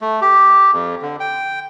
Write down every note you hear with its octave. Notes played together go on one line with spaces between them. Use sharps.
A3
G4
F2
D3
G5